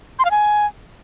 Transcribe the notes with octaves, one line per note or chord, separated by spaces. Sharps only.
C6
F5
G#5